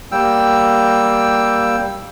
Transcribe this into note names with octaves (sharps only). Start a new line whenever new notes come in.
G3 A#3 G5 E6